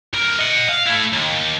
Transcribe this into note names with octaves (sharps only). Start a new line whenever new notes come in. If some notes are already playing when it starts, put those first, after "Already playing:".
B1 A#4
D#5 F#5
F5
A3 E4
D#2